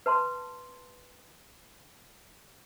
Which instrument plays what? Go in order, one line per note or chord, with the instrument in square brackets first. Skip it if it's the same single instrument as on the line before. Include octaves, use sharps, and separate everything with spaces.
[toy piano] B4 A5 C6